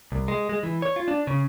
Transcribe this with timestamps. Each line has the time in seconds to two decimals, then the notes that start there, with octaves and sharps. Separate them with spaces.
0.12 C2
0.28 G#3
0.49 G#3
0.63 E3
0.82 C#5
0.96 F4
1.08 D4
1.27 C#3